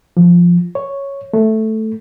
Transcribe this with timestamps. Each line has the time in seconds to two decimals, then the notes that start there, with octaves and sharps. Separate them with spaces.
0.17 F3
0.75 C#5
1.33 A3